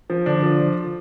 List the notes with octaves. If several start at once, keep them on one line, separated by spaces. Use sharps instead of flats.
F3
D3 D4
F3